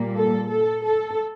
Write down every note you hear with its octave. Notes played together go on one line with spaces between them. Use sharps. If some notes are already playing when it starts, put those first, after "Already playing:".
Already playing: A#2 G3 A#3
A4
A4
A4